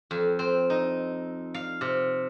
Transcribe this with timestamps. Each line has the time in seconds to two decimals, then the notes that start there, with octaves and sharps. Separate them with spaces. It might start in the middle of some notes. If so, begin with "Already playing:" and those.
0.11 F2
0.39 C4
0.70 D#4
1.54 F5
1.81 C3